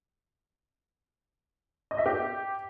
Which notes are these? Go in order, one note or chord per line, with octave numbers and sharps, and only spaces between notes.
D#5
E5
G4